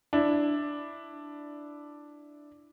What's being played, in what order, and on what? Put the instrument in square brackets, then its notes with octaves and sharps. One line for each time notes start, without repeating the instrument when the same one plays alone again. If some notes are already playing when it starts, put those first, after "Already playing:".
[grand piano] D4 E4